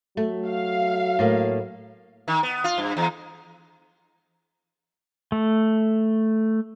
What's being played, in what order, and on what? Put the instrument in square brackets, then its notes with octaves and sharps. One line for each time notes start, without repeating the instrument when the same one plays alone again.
[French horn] F#3 [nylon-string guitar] A3
[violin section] F5
[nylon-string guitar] A2 A#3
[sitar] D#3
B3
F4
G2
E2
[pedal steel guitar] A3